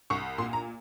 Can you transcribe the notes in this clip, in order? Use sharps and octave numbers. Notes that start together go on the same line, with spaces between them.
C2 C#6
A#2 C6
A#5